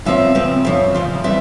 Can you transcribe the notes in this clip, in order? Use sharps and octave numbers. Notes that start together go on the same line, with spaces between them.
C#3 F3 C4 E5
C#3 F3 C4
F2 C#3 F3 E5
F2 C#3 F3
E3 G3 C4 E5